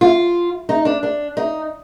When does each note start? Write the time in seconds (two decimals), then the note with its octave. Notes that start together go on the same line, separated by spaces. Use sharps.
0.01 F4
0.69 D#4
0.85 D4
1.03 D4
1.37 D#4